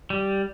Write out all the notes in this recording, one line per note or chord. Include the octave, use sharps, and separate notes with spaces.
G3